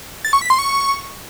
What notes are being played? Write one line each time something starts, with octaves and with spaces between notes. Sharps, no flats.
A6
C#6
B6
C6
C#6